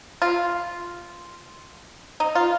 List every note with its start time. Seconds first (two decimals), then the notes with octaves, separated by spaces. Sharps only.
0.22 F4
2.20 D#4
2.35 F4